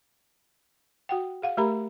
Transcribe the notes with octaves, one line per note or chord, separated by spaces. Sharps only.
F#4 F#5 G5
G#4 F5 F#5
A3 G4 A#4 A#5 B5